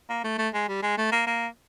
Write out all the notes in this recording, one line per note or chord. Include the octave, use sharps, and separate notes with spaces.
A#3
A3
A3
G#3
G3
G#3
A3
A#3
A#3